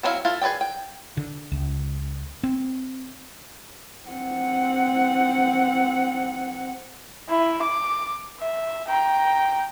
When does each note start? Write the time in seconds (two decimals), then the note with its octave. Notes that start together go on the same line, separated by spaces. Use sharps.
0.03 F#3 C4 D4 E4 F5
0.25 E4 F4 A4 F5
0.42 G#4 B4 C#5 D5 G5
0.61 G5
1.17 D3
1.52 C#2
2.43 C4
4.09 C4 F#5
7.29 E4
7.62 D6
8.41 E5
8.88 G5 A#5